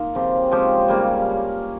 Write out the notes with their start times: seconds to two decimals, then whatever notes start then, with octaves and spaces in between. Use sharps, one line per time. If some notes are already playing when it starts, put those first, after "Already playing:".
Already playing: A#3 D#4 F4
0.15 C#3 F3 C4 G4
0.51 F3 G#3 C#4 G4
0.88 C#3 G3 A#3